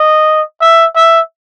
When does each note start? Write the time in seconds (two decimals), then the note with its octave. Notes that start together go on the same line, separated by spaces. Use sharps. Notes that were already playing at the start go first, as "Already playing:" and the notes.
Already playing: D#5
0.61 E5
0.96 E5